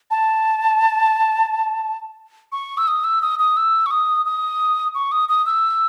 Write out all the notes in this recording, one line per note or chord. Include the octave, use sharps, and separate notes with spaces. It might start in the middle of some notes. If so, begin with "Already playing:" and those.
A5
C#6
E6
D#6
E6
D#6
D#6
E6
C#6
D#6
D#6
C#6
D#6
D#6
E6